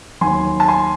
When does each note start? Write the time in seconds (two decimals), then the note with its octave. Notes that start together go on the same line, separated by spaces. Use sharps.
0.21 D#2 D#3 F#3 G#5 C6
0.60 A5
0.68 G#5 C6